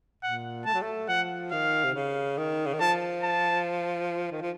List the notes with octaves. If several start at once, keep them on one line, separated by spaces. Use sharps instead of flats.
A#2 F#5
A3 A5
F#3
A3
F3 F#5
D#3 F5
C3
C#3
D#3
C#3
D#3
F3 A5
A5
D#3
F3